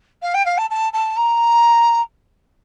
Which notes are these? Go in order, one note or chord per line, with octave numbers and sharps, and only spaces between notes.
F5
G5
F5
A5
A5
A5
A#5